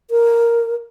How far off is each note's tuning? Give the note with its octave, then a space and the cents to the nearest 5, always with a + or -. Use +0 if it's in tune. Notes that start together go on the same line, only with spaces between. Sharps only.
A#4 +0